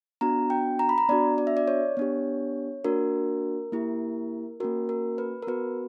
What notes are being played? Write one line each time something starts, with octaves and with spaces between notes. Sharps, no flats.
B3 D4 F#4 A#5
G5
A#5
B5
A#5
B3 D4 F#4 D5
D5
E5
D5
C#5
B3 D4 G4
A#3 D4 F#4 A#4
A#3 E4 G4
A#3 C#4 F#4 A#4
A#4
B4
A#4
B3 F#4 B4